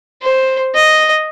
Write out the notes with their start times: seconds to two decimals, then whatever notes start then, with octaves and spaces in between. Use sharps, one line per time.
0.22 C5
0.75 D#5